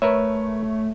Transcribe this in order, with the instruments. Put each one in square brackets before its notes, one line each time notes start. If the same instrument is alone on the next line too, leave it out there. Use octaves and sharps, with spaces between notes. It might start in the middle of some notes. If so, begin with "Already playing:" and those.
[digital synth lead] A3 [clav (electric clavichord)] A#4 B4 E5 [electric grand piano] C#5